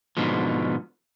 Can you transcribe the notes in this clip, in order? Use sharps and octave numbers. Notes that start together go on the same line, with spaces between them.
G#2 B2 D3 F3